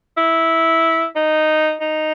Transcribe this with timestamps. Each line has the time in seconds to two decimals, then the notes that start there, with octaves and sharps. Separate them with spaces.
0.17 E4
1.16 D#4
1.81 D#4